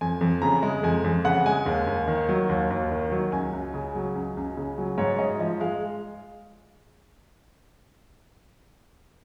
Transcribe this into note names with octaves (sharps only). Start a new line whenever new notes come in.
F2 G#5
F2
C#3 A#5
G#3
F2 G#5
F2
C#3 F#5
G#3 G#5
D#2
D#2
D#3
F#3
D#2
D#2
D#3
F#3
C#2 G#5
C#2
C#3
F#3
C#2
C#2
C#3
F#3
G#2 C#5
C#5
G#2 D#5
F3 D#5
G#3 F5